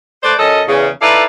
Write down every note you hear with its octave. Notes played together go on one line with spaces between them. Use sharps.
A3 B4 C5 D5
F#2 C#4 A4 D#5
E2 C#3
D#4 E4 A4 B4 D5 F5